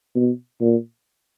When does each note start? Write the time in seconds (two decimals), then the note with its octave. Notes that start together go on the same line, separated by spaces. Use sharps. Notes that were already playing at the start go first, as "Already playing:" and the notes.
0.16 B2
0.61 A#2